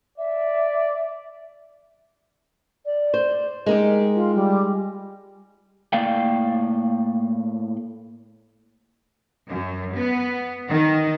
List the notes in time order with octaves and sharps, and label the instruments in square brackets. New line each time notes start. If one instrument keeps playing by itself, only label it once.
[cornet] D5 [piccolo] E5
[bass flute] D5
[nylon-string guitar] C5
[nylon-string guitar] G#3 D#4 G4 [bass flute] A#4
[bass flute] F4
G3
[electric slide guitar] A2 A#3 D5 F5 G5
[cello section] F#2
B3
D#3